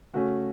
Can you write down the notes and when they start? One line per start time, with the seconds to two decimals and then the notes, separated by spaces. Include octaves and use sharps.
0.14 C#3 A3 C#4 F#4